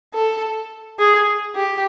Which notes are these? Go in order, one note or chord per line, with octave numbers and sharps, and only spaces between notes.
A4
G#4
G4